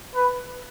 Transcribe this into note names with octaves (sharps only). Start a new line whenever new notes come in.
B4